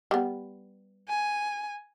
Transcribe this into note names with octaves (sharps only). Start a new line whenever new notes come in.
G3 B3
G#5